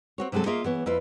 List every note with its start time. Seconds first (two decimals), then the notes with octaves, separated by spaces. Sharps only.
0.18 C4 F#4 C#5
0.32 C3 F#3 G#3 C4 A4
0.46 A#3 F4 G#4 D#5 E5
0.64 E3 B3 C#5
0.86 F2 E4 F4 B4